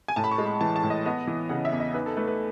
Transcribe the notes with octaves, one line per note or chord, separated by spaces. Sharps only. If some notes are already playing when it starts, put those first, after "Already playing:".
G#5
A2 A5
B5
C#6
G#3
B5
E3 A5
A5
A2
D#5
B3 D#5
E3
C#3 F#5
E5
E2
D#5
D#4 B4
A4
A3 B4
B4